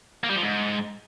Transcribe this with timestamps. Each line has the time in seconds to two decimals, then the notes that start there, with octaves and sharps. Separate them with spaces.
0.24 A#3
0.30 G3
0.36 F3
0.42 G#2